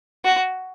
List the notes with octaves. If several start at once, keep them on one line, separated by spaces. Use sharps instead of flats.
F#4